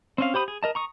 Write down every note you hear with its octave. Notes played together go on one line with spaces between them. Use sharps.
C4 C#4 F5
G4 C5 B5 D#6
G#4
A#4 D#5 A5
A#5 C#6 D#6